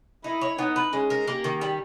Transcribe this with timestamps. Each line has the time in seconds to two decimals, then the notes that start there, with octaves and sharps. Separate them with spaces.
0.24 D#4 E4
0.41 C#5
0.59 B3 D#4
0.76 B4
0.93 G#3 C#4
1.10 A#4
1.27 A#3 G4
1.44 D#3
1.61 G3